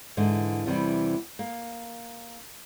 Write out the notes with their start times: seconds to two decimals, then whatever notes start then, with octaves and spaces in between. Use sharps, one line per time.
0.17 G#2 D3 E3
0.66 E2 C3 E3 G3
1.39 A#3